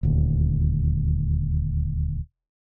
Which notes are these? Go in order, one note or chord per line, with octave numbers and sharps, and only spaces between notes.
D#1 D2